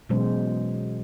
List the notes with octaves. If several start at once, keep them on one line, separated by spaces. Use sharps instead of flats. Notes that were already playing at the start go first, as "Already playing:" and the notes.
B2 E3 F#3 G#3 C#4 C5